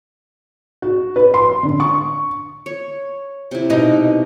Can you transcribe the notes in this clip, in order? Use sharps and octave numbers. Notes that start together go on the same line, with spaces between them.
F#4
B4
C6
D3
C#6
C#5
C3 E4
B2 D#4